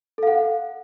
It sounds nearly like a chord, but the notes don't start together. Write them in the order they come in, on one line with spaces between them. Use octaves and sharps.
A4 F5 F#5